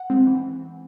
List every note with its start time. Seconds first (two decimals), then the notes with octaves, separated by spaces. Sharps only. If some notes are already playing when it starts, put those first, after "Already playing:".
Already playing: F#5
0.10 G#3 C4
0.27 E3